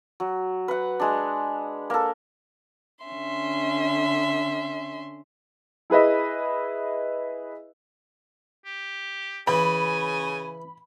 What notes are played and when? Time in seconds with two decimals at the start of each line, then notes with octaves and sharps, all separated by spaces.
0.20 F#3
0.68 B4 F#5
1.00 G#3 D4
1.90 A#3 A4
3.05 D3 C#4 E5 C6
5.90 E4 G#4 B4 D#5 E5
8.65 G4
9.47 C#3 E3 G#5 B5